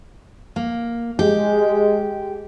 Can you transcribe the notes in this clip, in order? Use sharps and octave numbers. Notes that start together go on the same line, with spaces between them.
A#3
G#3 G4